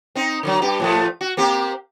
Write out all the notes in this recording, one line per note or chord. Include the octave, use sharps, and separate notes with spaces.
C4 D#4
D3 E3 F#3
G2 G4
A2 F3 A3
F#4
A#3 C4 G4